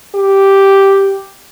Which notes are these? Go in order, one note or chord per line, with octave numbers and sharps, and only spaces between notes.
G4